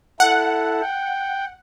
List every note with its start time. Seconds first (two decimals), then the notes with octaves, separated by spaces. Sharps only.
0.20 E4 A4 F#5
0.82 G5